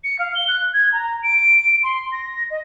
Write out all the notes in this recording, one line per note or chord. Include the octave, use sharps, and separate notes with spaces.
C#7
F5
G7
F#6
G#6
A#5
D7
C6
A#6
D#5